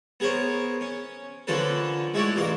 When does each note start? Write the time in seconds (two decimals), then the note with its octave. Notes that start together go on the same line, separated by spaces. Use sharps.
0.20 B3 G#4 A#4 C5 C#5
0.81 C#4
1.47 D3 F3 A#3 C#4 A4 B4
2.14 G#3 A3 E4 F#4 C#5 D5
2.36 A1 A#2 A#3 F5 C6